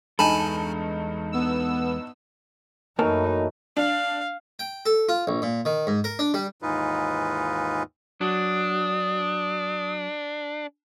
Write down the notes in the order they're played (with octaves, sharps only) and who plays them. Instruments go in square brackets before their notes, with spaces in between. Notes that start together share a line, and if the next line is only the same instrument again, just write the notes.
[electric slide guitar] E2 G#3 A4 [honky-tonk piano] G2 D#4 [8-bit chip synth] G#5 A5 B5
[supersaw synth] B3 E6
[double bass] F#2 [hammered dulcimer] E3 F#3 A3 [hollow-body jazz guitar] A#3 A#4 A5 [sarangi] D#4
[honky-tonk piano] D4 [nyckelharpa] F5
[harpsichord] G5
A4
F4
A#1
A#2
D#3
G#2
A#4
D4
G3
[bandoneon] D#2 G#2 E3 D#4 F4 B4
[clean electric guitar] F#3 [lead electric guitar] D4 [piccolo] D#6